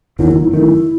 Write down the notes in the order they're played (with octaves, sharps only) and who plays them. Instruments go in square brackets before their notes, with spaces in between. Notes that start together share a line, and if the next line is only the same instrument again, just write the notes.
[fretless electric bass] F#1 E2 D#3 F#3 [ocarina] E4
[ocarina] D#4
E4
[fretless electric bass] G1 F#2 D#3 A3 [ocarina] E4